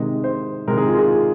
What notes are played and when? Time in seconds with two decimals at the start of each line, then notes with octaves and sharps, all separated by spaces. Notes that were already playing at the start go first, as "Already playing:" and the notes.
Already playing: C3 D#3 G#3 D#5
0.24 C5
0.68 C3 D#3 G#3 A#4
0.78 G#4
0.88 F4
0.99 G#4